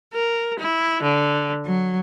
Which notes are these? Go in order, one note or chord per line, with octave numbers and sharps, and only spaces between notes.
A#4
E4
D3
F#3